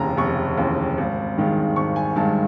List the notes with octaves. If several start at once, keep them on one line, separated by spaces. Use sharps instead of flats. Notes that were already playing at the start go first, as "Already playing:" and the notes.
Already playing: F1 D#2 C#3 E3 G#5 A#5
F1 C#6
D#2 C#3 E3
G#1
G2 D#3 G#3
G#1 C#6
G#5
G2 D#3 G#3 A5